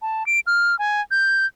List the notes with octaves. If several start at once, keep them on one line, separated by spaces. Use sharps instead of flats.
A5
D7
F6
G#5
G6